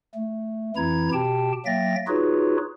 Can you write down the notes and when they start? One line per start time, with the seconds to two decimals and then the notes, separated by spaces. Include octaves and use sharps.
0.15 A3
0.76 F2 E3 E4 A#5 G#6
1.13 B2 G4 G5 A5
1.66 F#3 A#3 E5 G5 A6 A#6
2.08 D#4 F4 F#4 G#4 B4 C#5